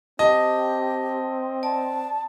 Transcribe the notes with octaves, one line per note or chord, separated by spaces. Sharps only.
C4 G4 D#5 A5
D5 A5